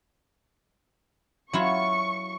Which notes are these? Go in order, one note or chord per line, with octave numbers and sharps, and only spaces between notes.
F#3 E4 F4 C#6